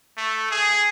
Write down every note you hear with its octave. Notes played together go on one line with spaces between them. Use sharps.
A3
G#4